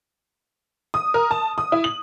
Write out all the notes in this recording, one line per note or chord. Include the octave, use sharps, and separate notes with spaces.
D#6
A#4
A5
D#6
E4
F#7